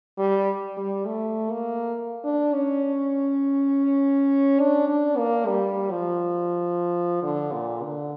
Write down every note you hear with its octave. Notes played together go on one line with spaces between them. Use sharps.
G3
G3
A3
A#3
D4
C#4
D4
D4
A#3
G3
F3
D3
A#2
D3